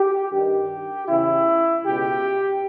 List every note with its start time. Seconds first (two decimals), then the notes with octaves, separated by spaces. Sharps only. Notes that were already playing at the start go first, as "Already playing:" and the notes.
Already playing: G4
0.32 G2 D#3 G4
1.08 E2 C#3 E3 E4
1.84 C#2 B2 G4